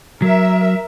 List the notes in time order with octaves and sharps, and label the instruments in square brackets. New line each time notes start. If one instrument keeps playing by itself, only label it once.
[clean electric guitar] F#3 [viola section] A#4 E5